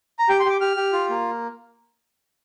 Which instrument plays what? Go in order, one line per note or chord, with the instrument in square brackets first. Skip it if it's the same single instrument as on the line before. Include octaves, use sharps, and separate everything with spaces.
[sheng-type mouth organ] A#5
G4 G5
C6
G4 D6
G4 F6
G4
F4
A#3